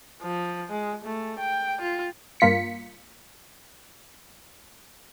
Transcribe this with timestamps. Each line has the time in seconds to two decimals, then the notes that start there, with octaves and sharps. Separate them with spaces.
0.22 F3
0.71 G#3
1.05 A3
1.39 G5
1.82 F4
2.40 G2 A#3 F4 B6 C#7